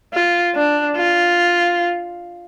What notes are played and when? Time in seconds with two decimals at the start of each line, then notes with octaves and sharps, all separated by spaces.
0.13 F4
0.55 D4
0.97 F4